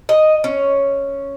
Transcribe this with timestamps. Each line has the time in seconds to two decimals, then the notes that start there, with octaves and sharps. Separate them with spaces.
0.09 D#5
0.44 C#4